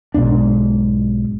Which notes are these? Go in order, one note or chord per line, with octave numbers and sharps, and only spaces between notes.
B1 G#2 B2 D4